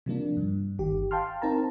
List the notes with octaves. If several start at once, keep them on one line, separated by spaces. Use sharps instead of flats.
C3 F3 A#3 D4
G2
G1 D#3 G4
F5 G5 A5 C6 F6
C4 D#4 A#4 A5 A#5